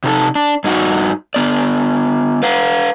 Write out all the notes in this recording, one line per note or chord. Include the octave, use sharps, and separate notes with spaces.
C3 D#4 A4
D4
G2 D#4 F#4
D3 B3 D5
B4 F5 F#5